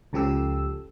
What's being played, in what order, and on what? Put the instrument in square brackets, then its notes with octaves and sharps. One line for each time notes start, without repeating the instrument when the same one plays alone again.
[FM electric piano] C#2 C#3 F3 G4 A4 E6